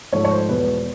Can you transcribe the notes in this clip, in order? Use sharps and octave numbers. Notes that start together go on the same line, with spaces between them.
G#2 F3 A3 C#5
C#5
C5
E2 B2 G#3 B4